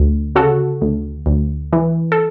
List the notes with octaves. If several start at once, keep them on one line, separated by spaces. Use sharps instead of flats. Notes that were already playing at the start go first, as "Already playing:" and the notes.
Already playing: D2
C#3 F#4 A4
D2
D2
E3
A4